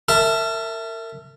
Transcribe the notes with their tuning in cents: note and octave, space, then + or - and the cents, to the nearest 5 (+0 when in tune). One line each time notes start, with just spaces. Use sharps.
A#4 -35 E5 +0 A5 +0